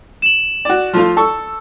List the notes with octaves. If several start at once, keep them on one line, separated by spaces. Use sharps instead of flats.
E7 F#7
F#4 D5
F3 A3 F4
A4 C#6 E6